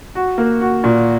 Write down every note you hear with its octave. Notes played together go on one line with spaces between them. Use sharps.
F#4
A#3
F#4
A#2